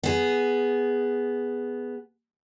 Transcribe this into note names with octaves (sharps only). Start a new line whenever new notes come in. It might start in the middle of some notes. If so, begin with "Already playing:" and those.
B3 G#4